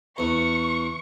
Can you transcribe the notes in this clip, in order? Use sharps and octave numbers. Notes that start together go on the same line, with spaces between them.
E2 C#6